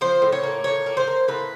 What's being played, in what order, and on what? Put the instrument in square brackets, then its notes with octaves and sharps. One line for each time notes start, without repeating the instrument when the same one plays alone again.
[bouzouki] F3 C5
A2
C#5
A#3
A2 C#5
A#3
C5
A#3
A2 B4